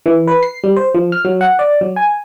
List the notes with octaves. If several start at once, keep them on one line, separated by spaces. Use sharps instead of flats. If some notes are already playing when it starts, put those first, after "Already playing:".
E3
B4
C7
G3
C5
F3
F6
F#3
F#5
D5
F#3
G#5